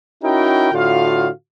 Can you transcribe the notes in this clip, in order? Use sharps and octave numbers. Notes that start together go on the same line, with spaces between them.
C#4 D#4 E4 F#4 A#4 G5
A2 D3 F4 F#4 F5